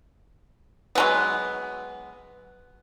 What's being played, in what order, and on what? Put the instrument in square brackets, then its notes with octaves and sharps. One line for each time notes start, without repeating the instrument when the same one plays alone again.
[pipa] F#3 G#3 B3